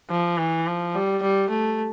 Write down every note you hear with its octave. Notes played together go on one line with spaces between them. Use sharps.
F3
E3
F3
G3
G3
A3